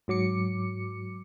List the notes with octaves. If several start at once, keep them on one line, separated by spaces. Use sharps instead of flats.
G#2 F#3 D6 C#7